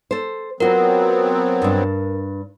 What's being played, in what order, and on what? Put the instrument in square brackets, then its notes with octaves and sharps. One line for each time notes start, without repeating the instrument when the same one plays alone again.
[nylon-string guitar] A4 C5
[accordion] F#3 B3 C4 [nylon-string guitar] F4 F#4 [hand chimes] A#4
[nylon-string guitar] G2 D4